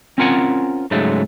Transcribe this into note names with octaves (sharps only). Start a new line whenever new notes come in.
C4 C#4 F4 A#4 F#5 G#5
G#2 C#3 F#3 G#3 A3